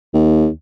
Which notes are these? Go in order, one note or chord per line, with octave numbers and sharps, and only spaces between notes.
D#2